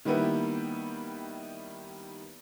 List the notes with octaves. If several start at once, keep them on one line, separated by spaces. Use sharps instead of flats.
D#3 G3 A#3 B3 E4